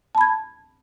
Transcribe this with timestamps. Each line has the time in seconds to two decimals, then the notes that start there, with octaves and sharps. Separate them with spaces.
0.15 A5
0.18 B5
0.21 G#6